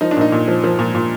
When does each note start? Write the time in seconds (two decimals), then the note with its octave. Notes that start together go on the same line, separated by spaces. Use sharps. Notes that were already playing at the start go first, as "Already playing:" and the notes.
0.01 F3 D#4
0.11 D4
0.17 A#2 D#4
0.32 A#2
0.48 F3
0.64 F3
0.79 A#2
0.95 A#2